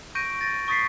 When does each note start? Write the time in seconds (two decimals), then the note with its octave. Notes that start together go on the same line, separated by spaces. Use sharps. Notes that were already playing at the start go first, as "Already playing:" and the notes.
0.15 C#6 G6 A#6 D7 D#7
0.41 A6 A#6
0.68 C#6 D#6 A6 B6 C7